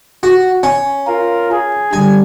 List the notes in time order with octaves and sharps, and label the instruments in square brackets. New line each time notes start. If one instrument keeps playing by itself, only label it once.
[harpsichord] F#4
C#4
[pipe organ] F4 A#4
G#4
[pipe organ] D3 G3 [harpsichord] G#5